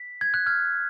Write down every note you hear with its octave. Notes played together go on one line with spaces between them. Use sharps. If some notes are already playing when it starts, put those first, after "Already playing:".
Already playing: B6
G#6
F#6
F6 G#6